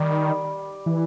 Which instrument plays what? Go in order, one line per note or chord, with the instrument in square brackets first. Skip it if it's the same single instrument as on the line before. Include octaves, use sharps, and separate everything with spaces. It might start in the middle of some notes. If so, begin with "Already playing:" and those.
Already playing: [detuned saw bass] D#3 [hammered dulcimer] G3
[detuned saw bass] E3